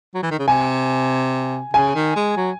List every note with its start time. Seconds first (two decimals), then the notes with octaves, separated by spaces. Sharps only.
0.15 F#3
0.23 E3
0.31 D#3
0.39 C#3
0.48 C3 G#5
1.73 C#3 G#5
1.95 D#3
2.16 G#3
2.37 F#3